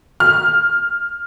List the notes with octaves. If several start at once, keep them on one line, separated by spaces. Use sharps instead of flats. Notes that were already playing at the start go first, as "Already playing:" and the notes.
F6